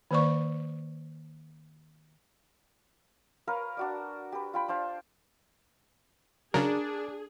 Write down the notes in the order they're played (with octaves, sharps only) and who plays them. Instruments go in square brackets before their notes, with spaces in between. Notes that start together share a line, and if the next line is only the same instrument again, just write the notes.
[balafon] D#3 A#3 C5 D5 C#6
[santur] A#4 B4 C#5 F5
D4 F#4 D5
G4 B4
F4 G5 B5
D4 C5 F5 A5
[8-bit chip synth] C#3 F#3 [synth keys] D4 [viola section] G#4 [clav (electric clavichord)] A#4